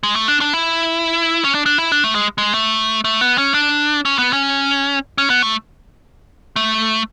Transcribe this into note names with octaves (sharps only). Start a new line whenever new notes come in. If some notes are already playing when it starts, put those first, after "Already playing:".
G#3
A3
D4
D4
E4
C#4
D4
D4
E4
D4
A3
G#3
G#3
A3
A3
B3
C#4
D4
C#4
B3
C#4
C#4
B3
A3
A3